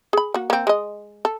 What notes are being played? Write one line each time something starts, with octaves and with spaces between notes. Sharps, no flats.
G#4 B5
A#3 F#4
A#3 C4
G#3 D#5
A4